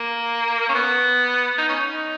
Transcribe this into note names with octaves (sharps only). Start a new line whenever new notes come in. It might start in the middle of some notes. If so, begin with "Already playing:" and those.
Already playing: A#3
C#4
B3
D#4
C#4
D#4